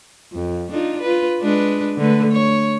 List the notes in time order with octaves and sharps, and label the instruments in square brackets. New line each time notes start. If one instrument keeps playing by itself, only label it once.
[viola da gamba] F2
D4 D#4 F4
F4 B4
G#3 D4 B4
D3 A3 B4
C#5